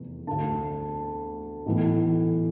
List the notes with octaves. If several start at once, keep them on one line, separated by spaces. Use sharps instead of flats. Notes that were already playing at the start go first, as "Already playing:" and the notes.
Already playing: F1 E2 C3
D2 D3 A5
B1 A2 E3